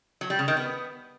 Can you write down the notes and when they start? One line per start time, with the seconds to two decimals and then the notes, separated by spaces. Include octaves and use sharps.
0.21 F#3
0.30 G3
0.39 C#3
0.48 D#3
0.57 B3